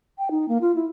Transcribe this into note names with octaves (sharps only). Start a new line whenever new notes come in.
G5
D#4
A#3
F4
E4